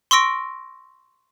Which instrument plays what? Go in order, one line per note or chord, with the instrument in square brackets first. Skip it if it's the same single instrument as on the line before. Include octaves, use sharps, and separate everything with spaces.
[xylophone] C6 C#6 E6 A#6 D7